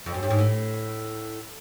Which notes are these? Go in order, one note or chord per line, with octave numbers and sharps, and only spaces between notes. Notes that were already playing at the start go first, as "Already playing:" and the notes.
F2
F#2
G2
G#2
A2